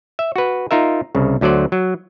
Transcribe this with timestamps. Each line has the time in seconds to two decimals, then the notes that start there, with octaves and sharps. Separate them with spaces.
0.19 E5
0.36 F#4 B4
0.71 D#4 F4 A#4 E5
1.15 C2 C#3
1.41 D2 D3 F#3 C5 D5
1.72 F#3